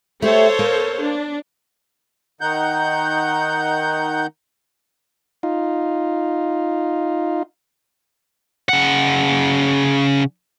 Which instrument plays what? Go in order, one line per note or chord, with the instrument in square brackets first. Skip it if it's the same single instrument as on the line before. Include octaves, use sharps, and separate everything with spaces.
[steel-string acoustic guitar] A3 G4 [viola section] A4 C5 C#5
[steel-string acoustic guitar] A#3
[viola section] D4
[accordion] D#3 D#4 F#5 G6
[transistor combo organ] D#4 F4
[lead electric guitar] C#3 F#5